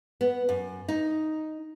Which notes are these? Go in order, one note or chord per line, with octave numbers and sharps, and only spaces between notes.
B3
F#2
D#4